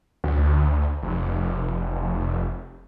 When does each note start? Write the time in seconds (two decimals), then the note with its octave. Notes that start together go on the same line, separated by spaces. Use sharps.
0.24 D2
1.03 F1